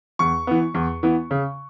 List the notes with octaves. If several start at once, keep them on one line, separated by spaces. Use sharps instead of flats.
E2 C#6
E3 B3
E2
E3 B3
C#3